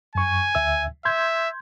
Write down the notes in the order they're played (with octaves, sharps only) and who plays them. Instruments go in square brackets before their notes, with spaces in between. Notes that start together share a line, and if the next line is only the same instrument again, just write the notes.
[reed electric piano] F#2 C#6 [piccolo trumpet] G#5
[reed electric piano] D2 E5 E6
[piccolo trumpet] E5 [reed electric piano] C6 G6 G#6